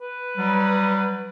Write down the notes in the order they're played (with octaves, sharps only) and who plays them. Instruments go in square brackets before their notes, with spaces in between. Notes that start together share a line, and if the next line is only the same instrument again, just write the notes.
[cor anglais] B4
[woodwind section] F#3 G3